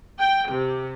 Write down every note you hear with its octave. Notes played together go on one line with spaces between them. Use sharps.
G5
C3